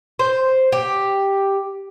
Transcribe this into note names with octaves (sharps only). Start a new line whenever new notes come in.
C5
G4